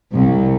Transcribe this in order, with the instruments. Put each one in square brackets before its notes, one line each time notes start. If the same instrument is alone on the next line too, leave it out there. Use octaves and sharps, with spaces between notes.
[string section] C2